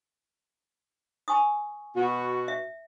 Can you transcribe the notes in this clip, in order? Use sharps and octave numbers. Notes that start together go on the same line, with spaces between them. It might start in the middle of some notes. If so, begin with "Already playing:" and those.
G#5 C#6 D#6
B2 B3 F#4
E5